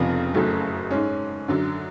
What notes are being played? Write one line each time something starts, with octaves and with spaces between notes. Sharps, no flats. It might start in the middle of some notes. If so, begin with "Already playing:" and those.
Already playing: F1 F2 C#3 F3 B3
F#1 F#2 C#3 F#3 A3
G#2 G#3 C#4
F#2 D3 F#3